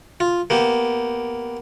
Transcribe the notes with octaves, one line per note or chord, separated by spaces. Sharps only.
F4
A#3 B3 G4